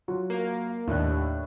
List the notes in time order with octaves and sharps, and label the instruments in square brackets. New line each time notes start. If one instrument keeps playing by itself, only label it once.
[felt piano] F#3 F4 F#4
[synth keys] A#3
[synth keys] D#2 [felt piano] A2 D4 F#6